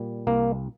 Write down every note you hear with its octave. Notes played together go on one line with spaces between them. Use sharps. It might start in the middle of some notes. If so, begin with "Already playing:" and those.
Already playing: A#2 G3
C2 A#3